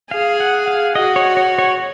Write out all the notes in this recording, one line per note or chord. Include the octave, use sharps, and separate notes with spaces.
G#4 F5
F#5
F5
F#4 D#5
C#5
C#5
C#5